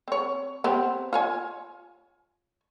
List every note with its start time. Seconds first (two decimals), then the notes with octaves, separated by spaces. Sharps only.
0.08 C4 C#5
0.64 B3 C4 G4
1.13 F4 C#5 G#5